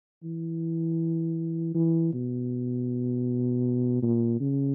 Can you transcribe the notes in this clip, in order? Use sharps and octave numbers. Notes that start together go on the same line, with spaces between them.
E3
E3
B2
A#2
C#3